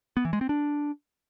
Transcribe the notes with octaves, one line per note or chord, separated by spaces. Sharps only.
B3
E3
G#3
C4
D4